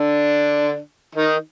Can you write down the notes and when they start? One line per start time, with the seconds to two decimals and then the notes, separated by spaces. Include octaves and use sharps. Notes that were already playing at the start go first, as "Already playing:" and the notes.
Already playing: D3 D4
1.15 D#3 D#4